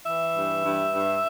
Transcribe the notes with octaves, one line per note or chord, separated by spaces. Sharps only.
E3 E5
G2
G2
G2